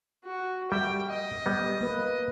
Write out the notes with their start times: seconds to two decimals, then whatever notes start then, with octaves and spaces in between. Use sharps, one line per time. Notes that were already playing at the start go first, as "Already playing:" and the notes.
0.24 F#4
0.72 G3 E5 G5
1.11 D#5
1.46 G3 B3
1.81 A#3 B4